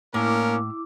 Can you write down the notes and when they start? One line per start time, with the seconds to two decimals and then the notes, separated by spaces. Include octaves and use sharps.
0.14 A2 A#3 C#4 D4 E4 A#4 D6